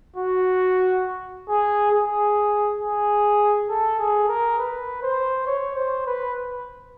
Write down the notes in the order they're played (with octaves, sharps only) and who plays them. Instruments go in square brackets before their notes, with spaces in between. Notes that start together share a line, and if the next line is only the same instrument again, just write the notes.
[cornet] F#4
G#4
G#4
G#4
A4
G#4
A#4
B4
C5
C#5
C5
B4